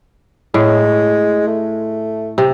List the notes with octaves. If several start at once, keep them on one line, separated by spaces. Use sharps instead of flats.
A2 G#3
A3
C3